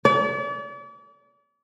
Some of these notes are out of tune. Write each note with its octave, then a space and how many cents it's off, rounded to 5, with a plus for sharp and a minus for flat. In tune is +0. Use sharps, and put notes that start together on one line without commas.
D5 -40